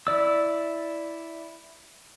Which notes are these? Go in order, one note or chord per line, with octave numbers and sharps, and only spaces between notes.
E4 D5 E6